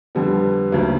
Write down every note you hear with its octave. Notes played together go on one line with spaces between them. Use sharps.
F2 D3 G3 B3
D2 C#3 F#3 A#3